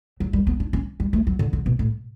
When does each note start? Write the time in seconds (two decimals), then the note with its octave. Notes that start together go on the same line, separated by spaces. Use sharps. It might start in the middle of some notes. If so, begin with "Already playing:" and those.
0.20 F#3
0.33 G3
0.47 B3
0.60 D4
0.73 C#4
1.00 G3
1.13 A3
1.27 F#3
1.39 D3
1.53 D3
1.66 B2
1.79 A2